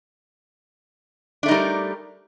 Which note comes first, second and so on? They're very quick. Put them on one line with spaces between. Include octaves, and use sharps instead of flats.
D4 A3 D#4 G3 A#4